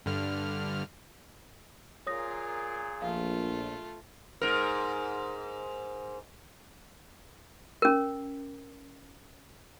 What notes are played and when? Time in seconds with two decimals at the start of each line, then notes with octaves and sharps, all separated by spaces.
0.06 G2 D3 F6
2.07 A#2 F4 G#4 A#4 C#5 D#6 A#6
3.02 A#1 A3 F4 F5
4.41 G#2 A#4
7.82 C#4 A#4